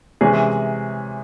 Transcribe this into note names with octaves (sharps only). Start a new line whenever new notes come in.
C3 E3 G#3 C#4 G#4